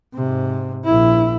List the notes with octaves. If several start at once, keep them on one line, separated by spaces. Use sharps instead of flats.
G#2 C3
A#1 E4